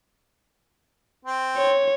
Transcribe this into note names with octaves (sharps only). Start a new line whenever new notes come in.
C4
C#5